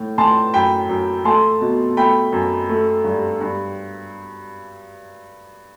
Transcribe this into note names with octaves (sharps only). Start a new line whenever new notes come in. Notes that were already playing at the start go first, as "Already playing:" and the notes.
Already playing: A2
A2 A5 C6
F#2 G5 B5
F#2
A3 A5 C6
B2
A3 G5 B5
F#2
A3
G2
G2